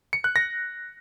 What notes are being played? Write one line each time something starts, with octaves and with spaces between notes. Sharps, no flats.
C#7
F#6
A#6